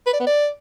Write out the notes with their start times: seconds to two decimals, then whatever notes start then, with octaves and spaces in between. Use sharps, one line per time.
0.07 B4
0.13 D5
0.20 B3
0.27 D5